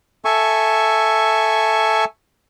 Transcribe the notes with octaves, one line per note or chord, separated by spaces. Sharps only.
A4 E5 G#5 C#6